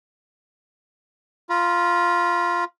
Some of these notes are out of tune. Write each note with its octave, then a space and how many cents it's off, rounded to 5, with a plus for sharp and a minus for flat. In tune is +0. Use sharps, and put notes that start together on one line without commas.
F4 +0 B5 -45